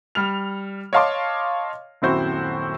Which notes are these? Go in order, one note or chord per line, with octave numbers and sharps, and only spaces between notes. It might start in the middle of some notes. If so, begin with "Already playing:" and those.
G3 F6 F7
C#5 D#5 F5 A5 C6 D6
D#1 F#2 C4 E4 F#4 C5